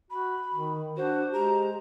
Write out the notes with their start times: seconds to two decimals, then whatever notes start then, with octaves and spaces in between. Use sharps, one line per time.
0.11 F#4 B5
0.54 D#3
0.97 D4 F#4 C5
1.33 G#3 G4 A#5